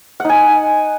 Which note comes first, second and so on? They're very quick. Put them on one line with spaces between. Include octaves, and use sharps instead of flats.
F#5 D#4 G#5